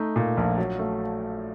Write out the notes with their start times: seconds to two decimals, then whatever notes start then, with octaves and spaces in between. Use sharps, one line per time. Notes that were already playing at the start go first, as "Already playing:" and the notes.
Already playing: A3 D#4
0.16 A#2
0.37 A#1
0.58 F#3
0.79 A3